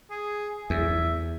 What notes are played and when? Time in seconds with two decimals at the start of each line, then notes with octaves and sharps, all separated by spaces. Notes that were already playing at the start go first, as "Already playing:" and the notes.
0.11 G#4
0.70 E2 E5